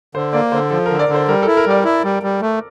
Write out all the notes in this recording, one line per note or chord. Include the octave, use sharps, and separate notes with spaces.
D3 C5
A#3 D5
D3 C5
F3 A4
D3 A#4
D5
D3
C5
G3 A#4
E4 A4
A#4
G3 D5
E4
G3
G3
A3